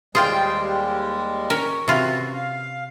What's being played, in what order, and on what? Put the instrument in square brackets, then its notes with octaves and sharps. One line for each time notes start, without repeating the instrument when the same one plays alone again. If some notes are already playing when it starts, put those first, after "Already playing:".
[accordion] D#2 G3 G#3 [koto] F4 G#4 [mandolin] C5 G5
[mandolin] C#4 [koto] A#4
[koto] C3 F4 B4 [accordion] F#4
[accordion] F5